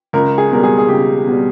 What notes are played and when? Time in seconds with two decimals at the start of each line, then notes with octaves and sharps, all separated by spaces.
0.13 C#2 A#4
0.38 G#4
0.51 B2 G3 A#4
0.64 G#4
0.78 G#4
0.88 C#2 G4
1.27 B2 G3